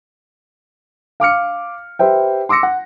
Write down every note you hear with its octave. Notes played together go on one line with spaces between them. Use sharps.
F5 D6 F6 C#7
G4 B4 C5 E5 G5
C6 D6 E6 A#6 C#7
F#5